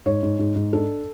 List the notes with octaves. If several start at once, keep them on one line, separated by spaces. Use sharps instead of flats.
G#2 C#5
G#2
G#2
G#2
D4 A4